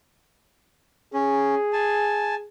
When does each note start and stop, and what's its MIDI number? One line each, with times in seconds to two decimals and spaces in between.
1.14 1.55 61
1.14 2.48 68
1.73 2.35 80
1.73 2.35 81